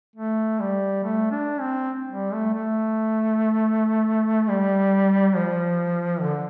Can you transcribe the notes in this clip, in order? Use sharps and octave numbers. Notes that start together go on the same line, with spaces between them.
A3
G3
A3
D4
C4
G3
A3
A3
G3
F3
D3